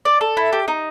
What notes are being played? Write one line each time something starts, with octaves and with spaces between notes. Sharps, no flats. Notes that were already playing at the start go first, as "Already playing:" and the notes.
D5
A4
E4
G4
D#4